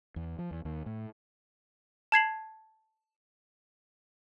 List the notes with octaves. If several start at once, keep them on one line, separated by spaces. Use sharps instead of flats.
E2
F3
E2
D#2
A2
A5 G#6 C7 F#7